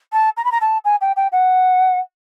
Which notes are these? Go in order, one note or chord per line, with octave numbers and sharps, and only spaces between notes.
A5
A#5
B5
A#5
A5
G#5
G5
G5
F#5